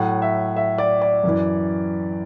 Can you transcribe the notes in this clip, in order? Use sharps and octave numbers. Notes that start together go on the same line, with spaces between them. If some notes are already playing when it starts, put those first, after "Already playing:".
Already playing: A2 F#3 F#5
E5
E5
D5
D5
F#2 E3